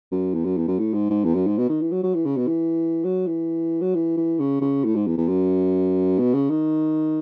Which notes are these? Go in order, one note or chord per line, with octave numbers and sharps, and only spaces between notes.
F#2
E2
F#2
E2
F#2
A2
G#2
G#2
E2
F#2
G#2
B2
D#3
E3
F#3
F#3
E3
C#3
B2
E3
F#3
E3
F#3
E3
E3
C#3
C#3
A2
G#2
E2
E2
F#2
B2
C#3
D#3